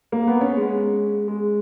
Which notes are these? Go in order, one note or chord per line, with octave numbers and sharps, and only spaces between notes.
A#3
B3
C#4
G#3
G#3